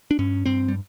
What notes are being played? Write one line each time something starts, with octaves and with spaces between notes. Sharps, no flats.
D4
G2 C#4
G2 C4
G3